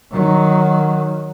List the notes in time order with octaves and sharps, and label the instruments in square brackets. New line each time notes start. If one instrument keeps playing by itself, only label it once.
[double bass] D#3 F#3